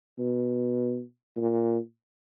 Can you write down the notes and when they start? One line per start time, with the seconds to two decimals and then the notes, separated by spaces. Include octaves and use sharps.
0.19 B2
1.37 A#2